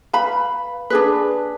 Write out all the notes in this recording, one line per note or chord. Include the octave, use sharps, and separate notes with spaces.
B4 F5 B5
D4 G#4 B4